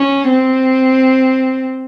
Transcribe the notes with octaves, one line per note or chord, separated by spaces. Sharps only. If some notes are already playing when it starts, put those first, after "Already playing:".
Already playing: C#4
C4